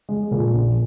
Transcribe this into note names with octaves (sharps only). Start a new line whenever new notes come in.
G#3
A#2
A#1